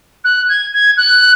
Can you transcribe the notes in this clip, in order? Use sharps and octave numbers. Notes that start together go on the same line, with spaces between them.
F#6
G#6
G#6
F#6